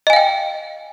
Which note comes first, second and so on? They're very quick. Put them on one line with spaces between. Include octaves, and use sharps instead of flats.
D#5 G#5 F5 G5